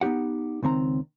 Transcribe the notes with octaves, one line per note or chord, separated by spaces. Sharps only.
B3 D#4 F4 G4 F#5
C#2 D#3 C4 A#5